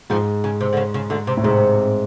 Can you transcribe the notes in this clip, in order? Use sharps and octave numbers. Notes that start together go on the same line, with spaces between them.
F2 G#2 F3
C#3
C3
D3
C#3
C#3
D2 D3
C3
A2
G#2 C3